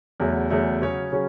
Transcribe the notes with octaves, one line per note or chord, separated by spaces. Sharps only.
E2 C#3 F#3 A3
E2 C#3 F#3 A3
C#3 F#3 C#4 G#4 C#5
C#3 F#3 C#4